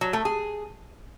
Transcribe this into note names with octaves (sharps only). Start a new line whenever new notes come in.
F#3
A3
G#4